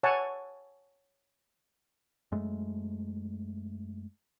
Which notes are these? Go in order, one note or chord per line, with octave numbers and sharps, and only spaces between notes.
C#5 F#5 G#5 A5
F#2 G#3 A3